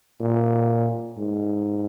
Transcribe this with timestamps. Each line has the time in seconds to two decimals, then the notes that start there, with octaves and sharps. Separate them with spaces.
0.21 A#2
1.18 G#2